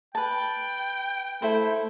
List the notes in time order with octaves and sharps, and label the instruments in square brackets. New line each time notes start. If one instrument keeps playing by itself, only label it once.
[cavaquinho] B4 A5 [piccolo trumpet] G5
[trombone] A3 [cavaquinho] E4 A4 C5